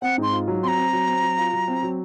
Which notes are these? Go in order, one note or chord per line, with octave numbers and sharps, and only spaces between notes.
C4 F#5
G#2 C6
F4
F#3
C4 A#5 C6
C4
F#3
C4
F#3
F4
F#3
C4
F#3